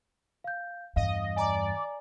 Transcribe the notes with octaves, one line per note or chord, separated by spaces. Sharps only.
F5 G6
E2 G2 D#5 F5
D5 G#5 A#5 D6